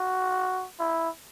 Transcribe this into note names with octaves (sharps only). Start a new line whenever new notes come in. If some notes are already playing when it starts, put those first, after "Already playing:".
Already playing: F#4
E4